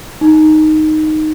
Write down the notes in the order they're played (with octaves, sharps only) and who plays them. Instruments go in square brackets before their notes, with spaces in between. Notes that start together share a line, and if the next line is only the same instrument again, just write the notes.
[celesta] D#4